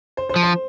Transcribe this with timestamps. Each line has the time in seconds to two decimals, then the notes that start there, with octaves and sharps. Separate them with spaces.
0.17 C5
0.29 C5
0.36 F3
0.43 C5